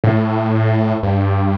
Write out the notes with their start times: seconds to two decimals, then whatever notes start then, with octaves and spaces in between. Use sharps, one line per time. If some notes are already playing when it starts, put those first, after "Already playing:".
0.04 A2
1.03 G2